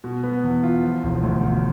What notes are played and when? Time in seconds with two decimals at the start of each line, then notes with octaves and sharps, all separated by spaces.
0.04 B2
0.23 B3
0.43 E2
0.63 F4
0.83 F3
1.04 E1
1.23 D2
1.43 E1